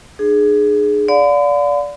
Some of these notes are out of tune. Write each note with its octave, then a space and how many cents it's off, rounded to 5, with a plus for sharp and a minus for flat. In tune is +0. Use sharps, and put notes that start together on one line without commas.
D4 +45 G#4 +10
D5 -20 F5 +35 B5 +45